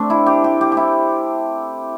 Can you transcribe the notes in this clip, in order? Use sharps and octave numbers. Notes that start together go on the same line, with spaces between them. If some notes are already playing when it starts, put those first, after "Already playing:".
Already playing: A3 C4 D4
E4
G4
G4
G4
G4
E4